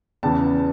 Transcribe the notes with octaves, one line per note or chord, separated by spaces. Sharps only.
E2 C#3 E3 A5